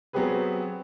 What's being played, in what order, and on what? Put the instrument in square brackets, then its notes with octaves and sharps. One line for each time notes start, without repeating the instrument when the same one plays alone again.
[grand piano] F#3 B3 C4 G4 G#4 B4